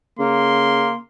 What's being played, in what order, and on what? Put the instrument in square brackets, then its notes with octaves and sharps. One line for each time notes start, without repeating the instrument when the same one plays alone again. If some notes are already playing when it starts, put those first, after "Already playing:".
[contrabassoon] C#3 [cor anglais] A#3 [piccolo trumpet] C6